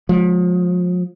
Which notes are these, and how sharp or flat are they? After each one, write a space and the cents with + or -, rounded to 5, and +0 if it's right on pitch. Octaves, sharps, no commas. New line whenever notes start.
F3 +35 G#3 +35